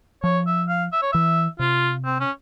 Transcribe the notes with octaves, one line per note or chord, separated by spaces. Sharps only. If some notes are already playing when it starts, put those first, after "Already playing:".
F3 C#5
E5
F5
E5
C#5
E3 E5
C3 F4
C4
C#4